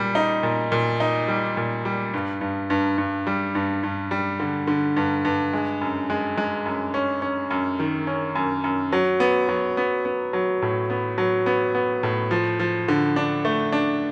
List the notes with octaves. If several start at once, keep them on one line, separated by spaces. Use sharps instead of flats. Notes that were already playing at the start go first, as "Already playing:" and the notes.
Already playing: A#2 G3
D#4
A#2
A#2
D#4
G3
A#2
G3
G2
G2
G2
G2
G3
G2
G2
G3
D3
D3
G2
G2
G#3
F#2
G#3
G#3
F#2
C#4
C#4
F#2
D#3
C#4
F#2
F#2
F#3
B3
F#3
B3
B3
F#3
A2
B3
F#3
B3
B3
A2
F3
F3
D3
D4
A3
D4